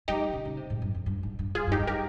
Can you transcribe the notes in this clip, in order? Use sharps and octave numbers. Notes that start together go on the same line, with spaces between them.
G#3 D#4 G4
C#3
C#3
C3
G#2
G2
F2
G2
G#2
G2
G#2 F4 G#4
G2
D#4 G4
G2
G4 A#4